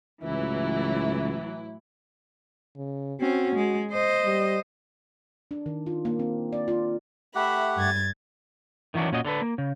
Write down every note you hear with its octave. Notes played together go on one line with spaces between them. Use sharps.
C#2 A2 E3 F#3 E4
C#3
C4 C#4 F#4
G#3
C5 D#5
G3
D4
D#3
F4
A#3
C4
D5
F4
A3 G4 E5 F#5 B5
G2 G#6 A6
D#3 E3 F#3 C#4 D4
A#2 C#4 F#4 D#5
D3 D4 A4 B4
A#3
C#3